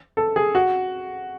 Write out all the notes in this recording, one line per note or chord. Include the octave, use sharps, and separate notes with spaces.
A4
G#4
F#4